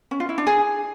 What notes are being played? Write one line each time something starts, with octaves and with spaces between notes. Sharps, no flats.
C#4
F4
E4
D4
G#4